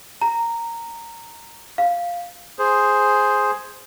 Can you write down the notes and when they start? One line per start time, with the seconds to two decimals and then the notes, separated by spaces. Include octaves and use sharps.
0.22 A#5
1.78 F5
2.59 G#4 C5